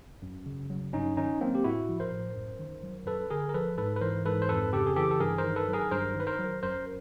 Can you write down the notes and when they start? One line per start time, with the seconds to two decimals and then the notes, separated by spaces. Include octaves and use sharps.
0.22 F#2
0.46 C#3
0.70 F#3
0.93 G2 C#4 D#4
1.17 D#3 C#4 D#4
1.41 F#3 A#3 C4
1.55 G4
1.64 A2 E4 F#4
1.89 F3
2.00 A#4 C5
2.12 A2
2.35 F#2
2.59 D#3
2.83 F#3
3.06 F#2 A4 B4
3.30 D3 G#4 A#4
3.49 A#4
3.54 F3 A4 B4
3.78 G#2 A4 B4
3.96 B4
4.01 E3 A#4 C5
4.26 G#2 A4 B4
4.42 C5
4.49 F2 A4 B4
4.73 C#3 G4 A4
4.86 G#4
4.96 E3 G4 A4
5.11 A4
5.20 G2 G#4 A#4
5.38 A#4 C5
5.44 D#3
5.56 A4 B4
5.68 F#3
5.73 G#4 A#4
5.91 G2 A#4 C5
6.15 D#3
6.20 B4
6.27 A#4 C5
6.39 F#3
6.63 F#2 A#4 C5